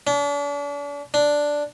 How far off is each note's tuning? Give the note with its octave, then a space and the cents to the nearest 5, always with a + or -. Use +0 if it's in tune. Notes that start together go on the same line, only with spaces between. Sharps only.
D4 -40
D4 +0